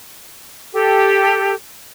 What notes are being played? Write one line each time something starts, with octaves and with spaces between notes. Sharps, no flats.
G4 A4